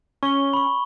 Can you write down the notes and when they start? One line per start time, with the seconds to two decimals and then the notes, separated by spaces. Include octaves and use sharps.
0.23 C#4 C#6 G7
0.53 B5 C#6